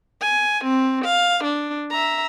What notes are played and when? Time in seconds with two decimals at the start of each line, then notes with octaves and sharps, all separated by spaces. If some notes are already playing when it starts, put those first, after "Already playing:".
0.22 G#5
0.64 C4
1.05 F5
1.44 D4
1.91 E5 A#5